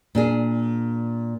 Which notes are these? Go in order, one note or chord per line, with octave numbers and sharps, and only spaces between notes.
A#2 D4 G#4